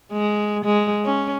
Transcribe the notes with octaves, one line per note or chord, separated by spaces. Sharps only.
G#3
G#3
C#4